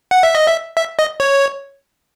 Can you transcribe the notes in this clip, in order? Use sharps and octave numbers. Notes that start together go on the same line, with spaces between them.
F#5
E5
D#5
E5
E5
D#5
C#5